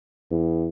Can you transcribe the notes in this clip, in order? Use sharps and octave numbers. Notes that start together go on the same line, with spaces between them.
E2